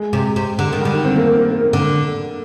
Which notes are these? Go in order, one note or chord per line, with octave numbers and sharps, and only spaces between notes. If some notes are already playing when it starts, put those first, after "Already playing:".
Already playing: G#3
C3
C3
D3
D#3
G3
D3
D#3
C4
A#3
A#3
A#3
A#3
A#3
D3 A#3